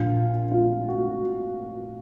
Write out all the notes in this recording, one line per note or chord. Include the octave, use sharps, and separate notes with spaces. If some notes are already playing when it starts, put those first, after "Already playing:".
Already playing: A#1 A#2 F3 F4
F4
F#4